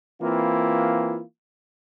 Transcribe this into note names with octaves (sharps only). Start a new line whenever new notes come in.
E3 A#3 C4 E4 F4